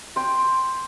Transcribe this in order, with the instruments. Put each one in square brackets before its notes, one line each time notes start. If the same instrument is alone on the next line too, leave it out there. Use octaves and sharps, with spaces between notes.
[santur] G5 C6